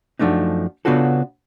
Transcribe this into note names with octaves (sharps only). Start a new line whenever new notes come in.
F#2 F3 A3 D4 D#4
C#3 B3 D4 F4 F#4 A4